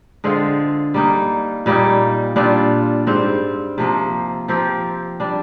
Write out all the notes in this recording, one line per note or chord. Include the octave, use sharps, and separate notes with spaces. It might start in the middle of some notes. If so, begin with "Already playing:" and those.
D3 G#3 C4 F4
G3 A#3 D#4
A#2 G3 A#3 D#4
A#2 G3 D4 F4
G#2 G3 C4
C3 F3 A#3
F3 C4 G4 A#4
G3 D4